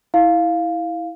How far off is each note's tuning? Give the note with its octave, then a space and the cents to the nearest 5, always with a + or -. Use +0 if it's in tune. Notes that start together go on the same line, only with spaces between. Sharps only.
E4 -15 F5 +0